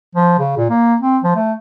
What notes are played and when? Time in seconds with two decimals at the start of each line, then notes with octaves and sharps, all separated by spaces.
0.15 F3
0.39 C#3
0.57 A#2
0.70 A#3
1.01 C4
1.23 F3
1.35 A3